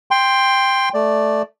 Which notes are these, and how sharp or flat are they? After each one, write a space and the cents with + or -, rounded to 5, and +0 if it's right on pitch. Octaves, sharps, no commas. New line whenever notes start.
G5 +15 C6 +0
A3 -5 D5 +0